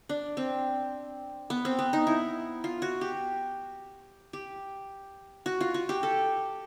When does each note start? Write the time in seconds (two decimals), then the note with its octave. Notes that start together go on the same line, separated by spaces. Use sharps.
0.09 D4
0.37 C4
1.50 B3
1.65 C4
1.79 B3
1.93 D#4
2.07 E4
2.64 F4
2.82 F#4
3.01 G4
4.33 G4
5.46 F#4
5.61 F4
5.74 F#4
5.89 G4
6.03 A4